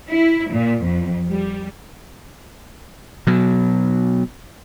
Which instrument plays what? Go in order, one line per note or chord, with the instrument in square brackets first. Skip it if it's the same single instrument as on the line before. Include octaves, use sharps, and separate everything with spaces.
[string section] E4
A#2
F2
G3
[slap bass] B2 F#3